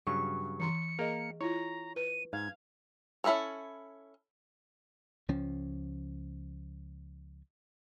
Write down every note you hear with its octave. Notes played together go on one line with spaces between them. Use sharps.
G2 C#3 F#3 C#6
E3 A#5 C6 C#7
A#3 G#4 A#4 D#5
E4 F4 C#5 A#5
B4 D#7
G#2 F5 G#6
C#4 E4 F#4 A4 C#5
C#2 F3 C#4